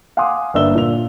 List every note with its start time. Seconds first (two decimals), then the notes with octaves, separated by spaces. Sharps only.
0.17 F5 F#5 G#5 C6 D6 D#6
0.54 G1 A#3 D4 E5 E6 G7
0.75 A#2 F7